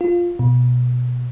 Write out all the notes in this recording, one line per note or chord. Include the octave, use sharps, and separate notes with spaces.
F4
B2